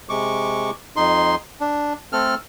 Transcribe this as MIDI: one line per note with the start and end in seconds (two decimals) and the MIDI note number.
0.09 0.71 48
0.09 0.71 56
0.09 0.71 85
0.09 0.71 86
0.96 1.35 41
0.96 1.35 63
0.96 1.35 84
1.61 1.93 62
2.13 2.35 57
2.13 2.35 60
2.13 2.35 69
2.13 2.35 89